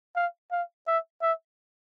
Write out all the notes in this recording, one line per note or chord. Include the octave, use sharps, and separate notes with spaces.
F5
F5
E5
E5